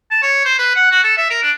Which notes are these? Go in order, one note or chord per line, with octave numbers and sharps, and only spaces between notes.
A5
C#5
C5
B4
F#5
F#4
A4
E5
A#4
D4